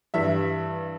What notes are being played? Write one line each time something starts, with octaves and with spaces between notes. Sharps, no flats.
G2 E3 G3 E5